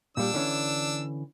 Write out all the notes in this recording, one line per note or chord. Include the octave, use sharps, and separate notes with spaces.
A#2 G3 D4 E6
D3 E3 C#4